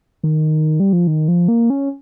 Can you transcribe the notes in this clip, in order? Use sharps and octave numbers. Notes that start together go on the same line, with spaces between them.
D#3
G3
F3
D#3
F3
A#3
C#4